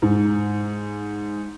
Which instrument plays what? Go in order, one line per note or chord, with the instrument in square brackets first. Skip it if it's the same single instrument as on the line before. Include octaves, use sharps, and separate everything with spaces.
[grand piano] G#2